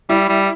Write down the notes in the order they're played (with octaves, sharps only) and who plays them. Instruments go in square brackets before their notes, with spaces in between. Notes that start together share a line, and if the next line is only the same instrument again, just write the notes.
[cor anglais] G3 [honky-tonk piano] E4
[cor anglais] G3